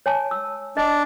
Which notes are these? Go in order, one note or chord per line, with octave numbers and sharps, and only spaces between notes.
C#5 G#5 A5
E6
D4 D#5